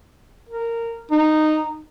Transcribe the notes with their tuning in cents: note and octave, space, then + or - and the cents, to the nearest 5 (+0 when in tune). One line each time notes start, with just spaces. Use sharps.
A#4 -15
D#4 -10